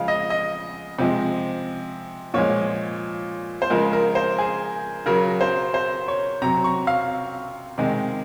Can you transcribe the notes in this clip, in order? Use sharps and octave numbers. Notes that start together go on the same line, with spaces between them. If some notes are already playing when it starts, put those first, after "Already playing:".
Already playing: C#3 F3 G#3 F5
D#5
D#5
C3 F3 G#3
A#2 F3 G#3 C#5
C5
C#3 F3 G#3 A#4
A#4
C5
G#4
C#3 F#3 A#4
C5
C5
C#5
C3 F#3 A#5
C#6
F5
C3 D#3 G#3